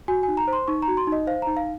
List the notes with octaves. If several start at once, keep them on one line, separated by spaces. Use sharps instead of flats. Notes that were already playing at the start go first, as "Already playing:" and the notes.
F#4 G#5
D#4 G#5
A#5
C5
C6
D#4 C#6
A#5
F#4
C6
D#4
D#5
C5 F5
D#4 A#5
F5